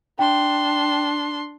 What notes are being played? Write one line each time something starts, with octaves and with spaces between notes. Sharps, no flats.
D4 G5 C6